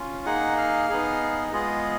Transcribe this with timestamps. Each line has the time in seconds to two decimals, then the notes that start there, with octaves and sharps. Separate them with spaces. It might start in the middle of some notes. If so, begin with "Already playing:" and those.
Already playing: C#4 F4
0.26 A#3 D#4 G#4 F#5
0.58 F5
0.90 B3 D#4 G#4
1.52 G#3 B3 F4 G#4 D#5